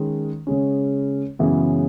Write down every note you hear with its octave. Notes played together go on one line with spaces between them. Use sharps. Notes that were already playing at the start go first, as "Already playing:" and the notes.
Already playing: D#3 G#3 C#4
C#3 G#3 C#4
F#2 C#3 E3 G#3 B3